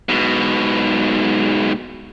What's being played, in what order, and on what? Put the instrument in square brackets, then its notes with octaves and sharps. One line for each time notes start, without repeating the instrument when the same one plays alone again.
[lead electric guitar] G#2 B2